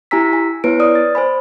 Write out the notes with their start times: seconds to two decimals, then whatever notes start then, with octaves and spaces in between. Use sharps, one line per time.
0.11 E4 G4 G#5 A#5 E6 B6
0.33 G#5
0.64 B3 E4 B4 C#5 D7
0.80 D5 D#6 F6
0.95 A6
1.15 C5 G#5 B5